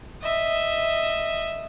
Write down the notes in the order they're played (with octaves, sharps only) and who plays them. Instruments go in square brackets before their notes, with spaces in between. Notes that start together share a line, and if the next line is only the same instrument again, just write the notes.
[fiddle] D#5 E5